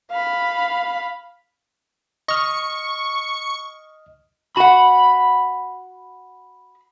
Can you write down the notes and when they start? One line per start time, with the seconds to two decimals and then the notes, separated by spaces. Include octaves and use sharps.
0.12 F5 B5
2.28 D#5 C#6 F6
4.57 F#4 F#5 B5